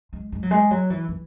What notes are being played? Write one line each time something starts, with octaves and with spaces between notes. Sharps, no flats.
G#3
G#3
F#3
G#3
F#3
E3
E3